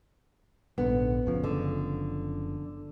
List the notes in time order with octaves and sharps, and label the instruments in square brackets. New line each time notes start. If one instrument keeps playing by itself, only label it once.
[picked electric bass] A#1 G#2 D3 [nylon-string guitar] B3
[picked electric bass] F#1 C#3 F3
[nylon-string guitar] D3